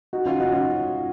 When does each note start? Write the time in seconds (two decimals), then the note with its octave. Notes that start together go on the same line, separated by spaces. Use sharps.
0.13 D#4 F#4
0.26 C#4 F4
0.40 D#4 F#4
0.52 C#4 F4